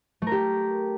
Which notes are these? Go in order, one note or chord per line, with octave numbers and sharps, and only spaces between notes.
A3 G4 A#4